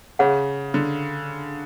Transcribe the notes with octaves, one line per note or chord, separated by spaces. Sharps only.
C#3 G#4 C#5 F#5
D3